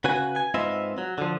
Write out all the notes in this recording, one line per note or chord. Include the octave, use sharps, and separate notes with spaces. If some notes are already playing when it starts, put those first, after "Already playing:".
C#3 F#4 B4 G#5
G#5
G#2 C4 F4 B4 D#5 E5
F#3
D3 F3